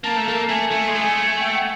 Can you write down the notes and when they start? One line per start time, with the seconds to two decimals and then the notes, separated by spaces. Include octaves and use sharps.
0.04 A#3 A5
0.17 A3
0.28 A#3
0.49 A3 G#5
0.71 A3
0.88 G#3
0.95 A3
1.39 G5
1.55 F#5